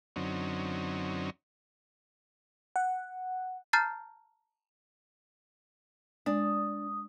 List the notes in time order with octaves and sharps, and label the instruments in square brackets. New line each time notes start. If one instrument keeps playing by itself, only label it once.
[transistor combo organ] F#2 D3 F#3 C4 C#4 D#4
[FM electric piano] F#5
[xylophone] A5 A#5 F6 G6 A6 C7
[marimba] G#3 [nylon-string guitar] D4 [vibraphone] D#6